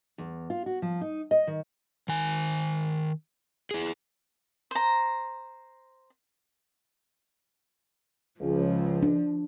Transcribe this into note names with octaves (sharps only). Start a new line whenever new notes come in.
E2
F4
F#4
F3
D#4
D#5
D#3
D#3 G#5
E4 G#4
C5 A#5
C#2 F3
D4